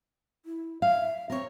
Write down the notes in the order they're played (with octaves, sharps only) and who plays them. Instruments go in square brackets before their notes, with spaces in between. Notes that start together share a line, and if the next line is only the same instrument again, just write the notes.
[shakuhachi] E4
[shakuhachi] E5 [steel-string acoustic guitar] F5
[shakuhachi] C4 [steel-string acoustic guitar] A#4 C#5